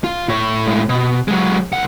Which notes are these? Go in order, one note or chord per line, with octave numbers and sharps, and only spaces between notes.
F4
A2 C#5
A2 G#3
B2
F#3 G#3
C2 F#5